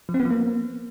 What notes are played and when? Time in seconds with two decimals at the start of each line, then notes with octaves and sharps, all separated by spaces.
0.09 F3
0.14 C4
0.20 B3
0.25 F3
0.30 A#3